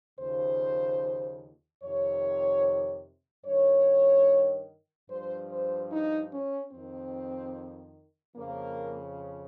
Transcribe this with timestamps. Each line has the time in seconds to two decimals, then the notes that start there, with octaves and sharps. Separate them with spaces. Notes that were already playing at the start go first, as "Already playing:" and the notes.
0.19 D#2 C#3 F3 C5
1.82 F2 C3 D#3 C#5
3.45 G2 D#3 C#5
5.09 G2 F3 C5
5.50 C5
5.92 D#4
6.32 C#4
6.72 F2 D#3 C4
8.36 F2 C#3 F3 A#3